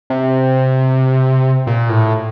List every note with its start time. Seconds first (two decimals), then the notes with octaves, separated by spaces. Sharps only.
0.10 C3
1.67 A#2
1.89 A2